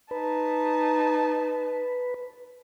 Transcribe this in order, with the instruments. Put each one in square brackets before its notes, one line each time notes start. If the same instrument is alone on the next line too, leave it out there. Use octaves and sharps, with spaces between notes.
[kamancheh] D#4 A5 [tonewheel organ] B4